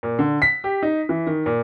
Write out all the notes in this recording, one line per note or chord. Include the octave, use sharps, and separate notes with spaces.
A#2
D3
B6
G4
D#4
E3
D#3
A#2